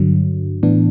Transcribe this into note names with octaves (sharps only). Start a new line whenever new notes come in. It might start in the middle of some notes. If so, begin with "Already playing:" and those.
Already playing: G2 D3 F#3
A2 E3 B3 D4